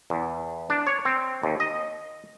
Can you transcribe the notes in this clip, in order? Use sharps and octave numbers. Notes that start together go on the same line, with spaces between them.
E2
D4
C#5
C4
D#2
D#5